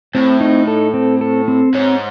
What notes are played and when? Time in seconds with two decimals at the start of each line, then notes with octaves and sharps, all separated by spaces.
0.15 A2 C4
0.40 D#4
0.68 A4
0.94 C4
1.21 A4
1.48 C4
1.74 G#2 C#5